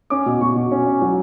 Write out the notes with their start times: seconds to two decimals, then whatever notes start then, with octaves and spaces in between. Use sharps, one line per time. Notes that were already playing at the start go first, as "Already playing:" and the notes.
0.10 C#4 D6
0.26 B2
0.41 B2 C#6
0.56 B2
0.71 C#4
0.87 C#4
1.01 F#3